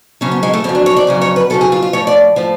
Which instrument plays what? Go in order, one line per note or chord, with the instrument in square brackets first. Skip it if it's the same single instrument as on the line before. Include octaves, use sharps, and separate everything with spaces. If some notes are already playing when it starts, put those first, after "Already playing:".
[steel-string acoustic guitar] F2 C#3 F#3 C#4
B3
G#3
A3
F2 C#3 F#3 C#4
D4
C#5
D5
F2 C#3 F#3
C#5
B4
F2 C#3 F#3 A4
G#4
F4
F4
A2 F3 C#5
D5
A2 F3